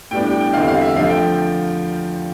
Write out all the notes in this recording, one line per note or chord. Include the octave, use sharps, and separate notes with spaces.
A2 G3 B3 D4 G5
G5
G5
E2 D3 G3 C4 F5
F5
E5
D3 F3 A3 F5
G5